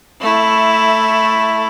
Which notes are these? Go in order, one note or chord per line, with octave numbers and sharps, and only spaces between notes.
A3 E4